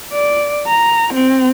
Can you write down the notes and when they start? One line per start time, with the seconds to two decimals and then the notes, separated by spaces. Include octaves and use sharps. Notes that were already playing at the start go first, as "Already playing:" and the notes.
0.13 D5
0.68 A#5
1.14 C4